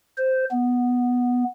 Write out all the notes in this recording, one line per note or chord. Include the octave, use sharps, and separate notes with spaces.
C5
B3